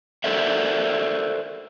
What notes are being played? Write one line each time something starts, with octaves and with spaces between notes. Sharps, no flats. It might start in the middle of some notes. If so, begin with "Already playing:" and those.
A4 A#4 C5 D5 E5